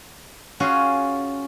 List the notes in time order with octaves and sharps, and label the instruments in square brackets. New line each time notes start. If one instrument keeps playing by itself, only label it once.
[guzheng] C#4 F4 F#4 G#4